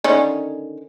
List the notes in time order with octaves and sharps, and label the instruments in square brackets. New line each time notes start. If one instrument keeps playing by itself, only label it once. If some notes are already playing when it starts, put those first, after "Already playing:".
[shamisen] D3 D#3 C#4